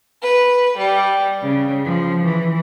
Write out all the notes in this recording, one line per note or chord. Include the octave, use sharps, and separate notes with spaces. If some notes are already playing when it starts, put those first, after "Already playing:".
B4
G3
C#3
F3
E3